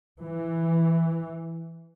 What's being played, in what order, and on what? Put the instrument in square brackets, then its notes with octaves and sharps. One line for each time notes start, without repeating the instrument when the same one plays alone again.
[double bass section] E3